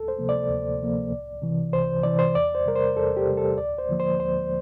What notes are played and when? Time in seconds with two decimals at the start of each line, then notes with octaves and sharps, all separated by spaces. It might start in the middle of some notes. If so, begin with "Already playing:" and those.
Already playing: D2 A4
0.08 C5
0.19 C3 F3 A#3
0.29 D5
0.49 D2
0.80 C3 F3 A#3
1.12 C2
1.42 C3 E3
1.73 C2 C5
2.03 C3 E3 D5
2.19 C5
2.35 E2 D5
2.55 C5
2.66 C3 G3 A#4
2.76 C5
2.97 E2 A4
3.17 G4
3.27 C3 G3
3.37 A4
3.58 D2 D5
3.78 C5
3.89 D3 F3 A#3
4.00 C5
4.20 D2 C5